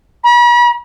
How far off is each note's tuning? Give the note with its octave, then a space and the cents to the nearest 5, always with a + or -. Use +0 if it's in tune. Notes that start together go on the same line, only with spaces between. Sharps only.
B5 -40